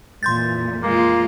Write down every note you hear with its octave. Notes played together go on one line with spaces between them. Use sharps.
F2 A#2 E3 C6 G6 A6
G#3 A#3 F4